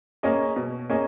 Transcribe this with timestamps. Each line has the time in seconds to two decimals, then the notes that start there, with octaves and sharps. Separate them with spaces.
0.23 A#3 C#4 G#4 D#5
0.56 B2
0.89 A#3 C#4 G#4 D#5